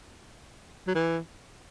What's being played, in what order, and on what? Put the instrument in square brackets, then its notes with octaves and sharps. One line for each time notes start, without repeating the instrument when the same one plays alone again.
[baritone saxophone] F#3
E3